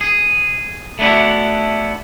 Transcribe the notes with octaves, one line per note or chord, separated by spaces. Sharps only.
G#4
A3 B3 D4 E4 F#4